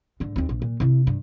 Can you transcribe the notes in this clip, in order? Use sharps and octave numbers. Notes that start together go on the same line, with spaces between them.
G#2 D3
D#2 C4
A#1
A#2
C3 E4
G2